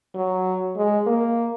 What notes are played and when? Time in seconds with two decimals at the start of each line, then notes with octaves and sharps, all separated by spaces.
0.15 F#3
0.76 G#3
1.07 A#3